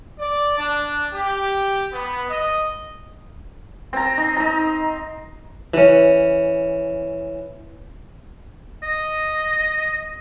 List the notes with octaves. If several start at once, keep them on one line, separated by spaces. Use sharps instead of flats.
D5
D4
G4
B3
D#5
C4 A#5
D#4
D#4 A#5
E3 C#4
D#5